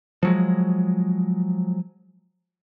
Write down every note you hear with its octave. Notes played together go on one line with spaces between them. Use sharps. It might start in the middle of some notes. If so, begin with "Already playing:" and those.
F3 F#3 G#3